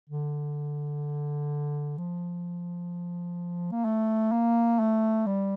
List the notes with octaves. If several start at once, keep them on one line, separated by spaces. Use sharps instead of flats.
D3
F3
A#3
A3
A#3
A3
G3